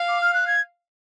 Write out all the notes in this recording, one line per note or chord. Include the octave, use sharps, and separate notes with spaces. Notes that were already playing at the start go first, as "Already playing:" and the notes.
Already playing: F5
D6
F6
F#6
G#6